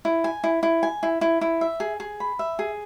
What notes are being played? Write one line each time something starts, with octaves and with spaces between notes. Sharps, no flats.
E4
G#5
E4
E4
G#5
E4
E4
E4
E5
G#4
G#4
B5
E5
G#4